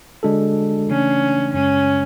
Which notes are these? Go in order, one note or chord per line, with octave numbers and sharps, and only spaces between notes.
D3 G#3 D4 F#4 A4
C#3 E3 A3 C#4 D4
F#2 C#3 G#3 C#4